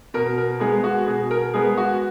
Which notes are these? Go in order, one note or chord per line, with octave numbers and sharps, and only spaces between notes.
B2 A#4
A#4
G#3 B3 G#4
F#4
B2 G#4
A#4
G#3 B3 G#4
F#4